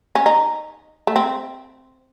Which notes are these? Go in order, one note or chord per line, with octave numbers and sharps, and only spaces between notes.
C#4
D#4
A3
C4